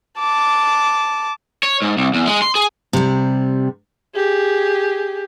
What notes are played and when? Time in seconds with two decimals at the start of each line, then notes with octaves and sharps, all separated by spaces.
0.19 A5 D6
1.63 C#5
1.82 G#2
1.97 C2
2.14 E2
2.27 G#3
2.42 C6
2.55 G#4
2.93 C3 G3
4.15 G4 G#4